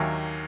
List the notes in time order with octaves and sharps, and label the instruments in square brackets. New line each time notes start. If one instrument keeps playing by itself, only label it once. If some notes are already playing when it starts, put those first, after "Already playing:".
Already playing: [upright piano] D#2 D#3 F#3 A#3 E5 G#5